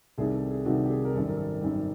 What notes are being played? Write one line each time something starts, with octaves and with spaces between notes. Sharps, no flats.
C2 C3 D#3 G3 G#4
A4
G#4
C2 C3 D#3 G3 F#4
G4
G#4
A#4
G#1 F#2 D#3 G3 A4
A#4
A4
G#1 F#2 D#3 G3